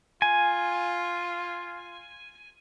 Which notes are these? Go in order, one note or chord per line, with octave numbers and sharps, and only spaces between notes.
F4 G#5